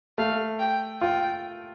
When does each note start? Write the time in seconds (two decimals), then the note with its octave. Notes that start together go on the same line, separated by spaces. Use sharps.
0.18 A3 F5
0.60 G5
1.01 F4 G5